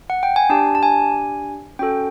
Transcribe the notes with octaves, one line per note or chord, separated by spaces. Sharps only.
F#5
G5
G#5
D4 G4 A5
A5
G#5
C#4 F#4 A4 G5